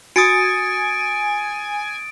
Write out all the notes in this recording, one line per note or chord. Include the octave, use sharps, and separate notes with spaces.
F#4 G#5 D#6 A6 C#7 D7